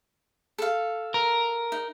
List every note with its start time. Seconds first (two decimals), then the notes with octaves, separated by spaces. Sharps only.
0.58 A4 F5
1.14 A#4
1.72 D#4